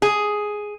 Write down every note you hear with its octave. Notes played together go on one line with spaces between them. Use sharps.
G#4